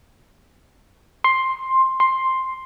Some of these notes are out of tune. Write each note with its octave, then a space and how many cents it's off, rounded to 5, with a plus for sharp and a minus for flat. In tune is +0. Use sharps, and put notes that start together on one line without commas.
C6 +10
C6 +5